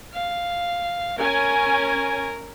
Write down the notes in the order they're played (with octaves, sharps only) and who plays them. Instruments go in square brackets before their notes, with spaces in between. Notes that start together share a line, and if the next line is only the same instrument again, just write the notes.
[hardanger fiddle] F5
[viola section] C#4 G#5 [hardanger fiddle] A#4